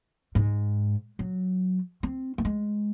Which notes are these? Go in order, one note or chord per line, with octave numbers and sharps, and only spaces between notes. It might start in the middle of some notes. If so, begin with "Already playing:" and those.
G#2
F#3
C4
A3
G#3